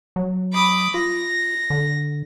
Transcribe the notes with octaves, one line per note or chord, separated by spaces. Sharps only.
F#3
B5 D6 D#6
F4 A#6
D3